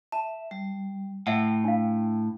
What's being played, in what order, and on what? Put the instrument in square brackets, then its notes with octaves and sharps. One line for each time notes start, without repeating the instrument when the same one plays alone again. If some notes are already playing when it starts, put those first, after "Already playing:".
[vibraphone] E5 [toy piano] A5
[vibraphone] G3
[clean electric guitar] A2 [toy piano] E5 F#5 [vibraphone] G5
[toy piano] D4 F5